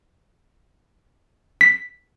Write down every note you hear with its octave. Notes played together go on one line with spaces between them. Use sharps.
B6